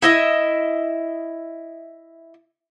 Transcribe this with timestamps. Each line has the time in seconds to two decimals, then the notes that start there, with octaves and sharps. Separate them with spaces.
0.02 E4 D#5 E5